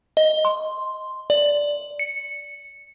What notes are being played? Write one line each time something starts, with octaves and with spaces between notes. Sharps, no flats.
D#5
C6
D5
C#7